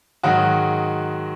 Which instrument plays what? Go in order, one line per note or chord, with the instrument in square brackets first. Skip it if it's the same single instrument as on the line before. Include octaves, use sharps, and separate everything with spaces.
[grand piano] G#2 D#3 F#3 F#4